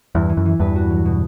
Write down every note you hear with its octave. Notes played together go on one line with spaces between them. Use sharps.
E2 G2 E4
E3
F#2
E3
E2 G2 B4
F#4
F#3
B2